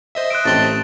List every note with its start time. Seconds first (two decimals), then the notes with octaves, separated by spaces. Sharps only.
0.15 C5 D#5 E5
0.30 F#6 D7
0.46 A1 C4 A5 C6